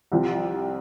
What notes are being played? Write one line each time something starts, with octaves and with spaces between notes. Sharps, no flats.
C2 C3 F3